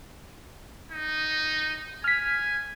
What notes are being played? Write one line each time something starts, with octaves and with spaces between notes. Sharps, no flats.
D#4
G#5 F6 B6